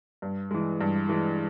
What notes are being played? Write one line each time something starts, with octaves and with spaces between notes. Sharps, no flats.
G2
E3 G#3
G2
E3 G#3